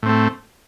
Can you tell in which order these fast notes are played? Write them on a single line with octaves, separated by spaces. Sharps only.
A2 C4 A3